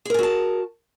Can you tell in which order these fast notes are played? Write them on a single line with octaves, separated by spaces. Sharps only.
G#4 A#4 G#5 F#4 A5